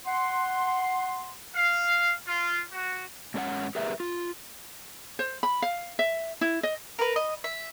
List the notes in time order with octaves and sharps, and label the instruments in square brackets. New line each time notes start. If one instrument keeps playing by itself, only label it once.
[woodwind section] F#5 C6
[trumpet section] F5
F4
F#4
[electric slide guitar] G#2 C#4 A4 C#5 F#5
G4 G#4 A#4 B4 E5
F4
[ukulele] C5
B5
F5
E5
E4
D#5
[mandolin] A#4 B4
D#5
E5